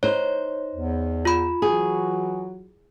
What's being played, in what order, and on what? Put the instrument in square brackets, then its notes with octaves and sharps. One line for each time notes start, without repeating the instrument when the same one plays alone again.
[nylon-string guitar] D#4 C5 [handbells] C#5
[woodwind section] E2
[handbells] F4 B5
[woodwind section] E3 F#3 F#4 [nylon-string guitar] G#4